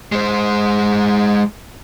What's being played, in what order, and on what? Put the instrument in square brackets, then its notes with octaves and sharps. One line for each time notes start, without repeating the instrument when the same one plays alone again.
[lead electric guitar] G#3 C5